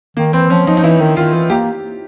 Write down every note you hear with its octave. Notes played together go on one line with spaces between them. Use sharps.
D#3 A#3
E3 C4
F3 C#4
F3 D#4
D#4
E3 E4
D#3
D#3 F4
E3
A#3 G4